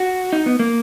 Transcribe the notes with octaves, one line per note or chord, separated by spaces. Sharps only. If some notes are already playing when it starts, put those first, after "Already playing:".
Already playing: F#4
D#4
B3
A#3